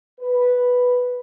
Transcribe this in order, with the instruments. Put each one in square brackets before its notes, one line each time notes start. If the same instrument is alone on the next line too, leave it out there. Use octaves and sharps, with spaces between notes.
[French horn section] B4